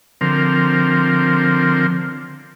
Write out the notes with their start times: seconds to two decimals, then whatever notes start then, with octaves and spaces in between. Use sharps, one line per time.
0.21 D3 F3 C4 A#4